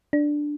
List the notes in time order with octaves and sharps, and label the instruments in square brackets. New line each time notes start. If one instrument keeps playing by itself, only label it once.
[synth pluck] D4